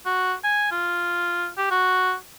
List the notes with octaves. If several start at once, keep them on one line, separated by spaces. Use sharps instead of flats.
F#4
G#5
F4
G4
F#4